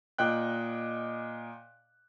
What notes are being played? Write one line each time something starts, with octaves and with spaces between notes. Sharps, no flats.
A#2 D#5 G5 F#6